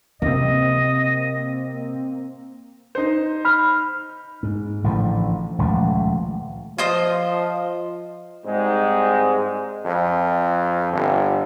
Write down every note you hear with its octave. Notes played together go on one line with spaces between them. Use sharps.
C3 A#3 C4 D#5
D#4 C5
B5 F6
G#2
A1 A2 D3 F3
D#1 C#2 F3 A3
F3 F4 C5 D#5
G#2 G3 G#3 C4 D#4
F2
G1